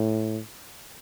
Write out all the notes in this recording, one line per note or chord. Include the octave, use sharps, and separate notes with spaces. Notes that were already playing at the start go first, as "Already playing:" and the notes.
Already playing: A2